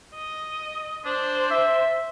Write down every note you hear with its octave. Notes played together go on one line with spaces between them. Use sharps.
D#5
D4 C5
E5